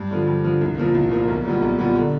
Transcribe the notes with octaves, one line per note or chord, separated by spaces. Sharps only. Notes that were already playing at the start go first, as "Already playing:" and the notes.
Already playing: G2
D3 F3
G2
D3 F3
C2
A#2 F3 A#3
C2
A#2 F3 A#3
B1
A#2 G3 B3
B1
A#2 G3 B3
D3